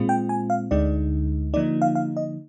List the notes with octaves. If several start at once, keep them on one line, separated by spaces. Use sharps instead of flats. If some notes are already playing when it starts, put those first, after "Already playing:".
Already playing: A#2 G#3 C4 F4
G5
G#5
F5
D2 D3 G#3 D#4 D5
D3 F3 A#3 D#4 D5
F5
F5
D#5